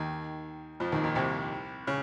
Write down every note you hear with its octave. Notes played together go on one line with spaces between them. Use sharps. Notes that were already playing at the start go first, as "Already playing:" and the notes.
Already playing: D#2 D#3
F2 F3
D#2 D#3
A#2
C2 C3
C#3